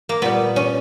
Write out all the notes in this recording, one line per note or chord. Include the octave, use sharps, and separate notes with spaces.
A#3
A#2 G3 B3
C#4